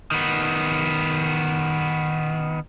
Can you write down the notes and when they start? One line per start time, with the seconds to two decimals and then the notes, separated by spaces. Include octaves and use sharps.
0.11 D#3 B3